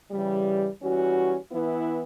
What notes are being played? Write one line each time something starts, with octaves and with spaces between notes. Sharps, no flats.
C#3 E3 G3
E3 G3 C#4 F#4
E3 B3 E4